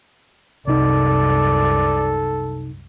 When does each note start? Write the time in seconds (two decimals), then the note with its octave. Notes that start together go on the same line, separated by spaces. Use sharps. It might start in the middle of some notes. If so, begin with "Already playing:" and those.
0.68 C2 F#2 C3 D#4 A4 D5